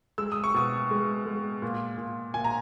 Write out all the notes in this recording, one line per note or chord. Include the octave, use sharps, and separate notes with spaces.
G#3 E6
D#6
C#6
B2 D#6
G#3
G#3
A#2
A#2
A#2 G#5
A#5